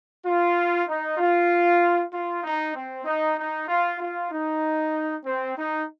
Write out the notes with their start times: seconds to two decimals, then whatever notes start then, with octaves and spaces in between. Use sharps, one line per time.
0.24 F4
0.87 D#4
1.18 F4
2.12 F4
2.44 D#4
2.75 C4
3.05 D#4
3.37 D#4
3.68 F4
3.99 F4
4.30 D#4
5.24 C4
5.56 D#4